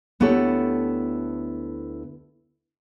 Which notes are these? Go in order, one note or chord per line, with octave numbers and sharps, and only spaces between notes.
D2 B3 E4 G4 A4 C#5